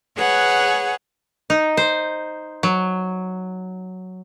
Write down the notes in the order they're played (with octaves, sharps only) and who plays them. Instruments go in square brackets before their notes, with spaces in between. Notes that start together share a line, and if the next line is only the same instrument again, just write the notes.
[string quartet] G#4 B4 C#5 F#5
[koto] D#4
C5
F#3